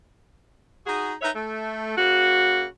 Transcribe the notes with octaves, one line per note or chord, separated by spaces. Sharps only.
D#4 F#4 G#4
D#4 B4 C#5 E5
A3
C#3 A#3 F#4